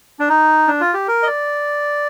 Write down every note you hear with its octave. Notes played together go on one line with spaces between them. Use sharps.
D4
D#4
D4
F4
G4
A#4
D#5
D5